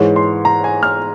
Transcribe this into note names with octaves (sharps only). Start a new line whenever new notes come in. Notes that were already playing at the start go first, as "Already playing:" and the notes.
Already playing: G#2 E3 G#3 C#5
C6
A#5
G#5
F6